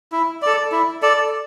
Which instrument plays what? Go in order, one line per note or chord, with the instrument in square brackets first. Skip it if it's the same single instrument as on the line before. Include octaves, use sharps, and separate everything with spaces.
[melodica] E4
A4 D5
E4
A4 D5